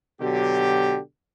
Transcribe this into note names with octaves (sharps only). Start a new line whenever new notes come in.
B2 D3 F#3 G4